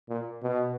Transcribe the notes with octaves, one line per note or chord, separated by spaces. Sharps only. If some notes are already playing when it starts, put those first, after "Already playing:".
A#2
B2